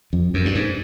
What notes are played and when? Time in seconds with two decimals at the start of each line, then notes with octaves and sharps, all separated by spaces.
0.13 F2
0.34 F#2
0.45 G2
0.55 G#2